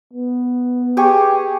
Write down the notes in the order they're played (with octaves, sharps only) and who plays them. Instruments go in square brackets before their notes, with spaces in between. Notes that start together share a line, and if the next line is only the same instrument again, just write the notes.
[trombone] B3
[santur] G4 G#4 C#6